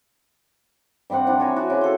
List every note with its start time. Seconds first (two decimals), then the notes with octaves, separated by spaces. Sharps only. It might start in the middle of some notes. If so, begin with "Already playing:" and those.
1.10 G2 G3 C4 F#5
1.27 F3 D4 E4
1.40 C#5 G#5 A#5
1.56 F#4 D5
1.70 C#3
1.81 A4 C5